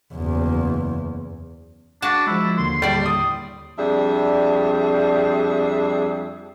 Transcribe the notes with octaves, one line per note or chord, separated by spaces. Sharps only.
F#1 E2
D4 F#4 A5
F3 G#3 E4
D#2 D3 A#3 C6
A2 G3 D5
D#6
F2 G3 D4 G#4 E5